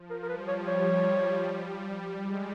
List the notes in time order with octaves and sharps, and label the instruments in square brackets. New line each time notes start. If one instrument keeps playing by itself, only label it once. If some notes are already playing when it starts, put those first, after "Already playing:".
Already playing: [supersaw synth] F3
[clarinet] A#4
A#4
[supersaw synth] G3 [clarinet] B4
[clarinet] C#5
C#5
[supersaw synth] G#3